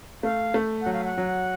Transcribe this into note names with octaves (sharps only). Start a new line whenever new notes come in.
A3 F5
A3
F#3 F#5
F5
F#5
F#3